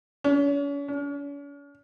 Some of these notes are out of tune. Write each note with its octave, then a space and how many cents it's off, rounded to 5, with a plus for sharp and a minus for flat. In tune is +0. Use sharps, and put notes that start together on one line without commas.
C#4 +40
C#4 +45